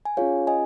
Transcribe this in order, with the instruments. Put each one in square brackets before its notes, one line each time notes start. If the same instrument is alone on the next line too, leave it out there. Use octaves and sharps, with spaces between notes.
[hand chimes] G#5
C#4 F4 G#4 C#5 F5
D#5 G#5